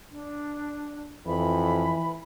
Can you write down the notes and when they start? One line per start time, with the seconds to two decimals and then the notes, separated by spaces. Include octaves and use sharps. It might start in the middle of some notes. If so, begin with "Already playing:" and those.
0.12 D4
1.27 F2 E3 B5